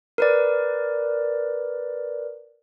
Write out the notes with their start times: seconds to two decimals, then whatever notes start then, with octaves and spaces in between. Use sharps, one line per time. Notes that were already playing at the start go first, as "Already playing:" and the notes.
0.18 A#4 B4 D5